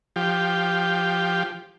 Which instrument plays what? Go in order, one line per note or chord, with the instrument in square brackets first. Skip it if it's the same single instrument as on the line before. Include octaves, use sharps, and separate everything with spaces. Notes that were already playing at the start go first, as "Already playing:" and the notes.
[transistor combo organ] F3 G4